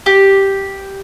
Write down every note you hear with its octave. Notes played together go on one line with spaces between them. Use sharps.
G4